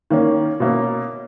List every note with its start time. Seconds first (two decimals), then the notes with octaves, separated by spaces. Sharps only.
0.10 D#3 A#3 C#4
0.60 B2 A#3 C#4